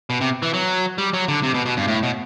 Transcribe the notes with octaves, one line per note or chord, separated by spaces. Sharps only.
B2
C3
E3
F#3
G3
F#3
D3
C3
B2
B2
G2
A2
B2